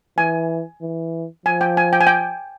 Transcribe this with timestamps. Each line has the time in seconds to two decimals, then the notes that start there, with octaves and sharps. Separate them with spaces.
0.18 E3 G#5
0.82 E3
1.45 F3 G#5
1.61 G5
1.77 G#5
1.93 G5
2.01 G#5
2.07 G5